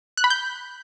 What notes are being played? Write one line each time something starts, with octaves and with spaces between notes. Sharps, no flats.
F#6
B5
G6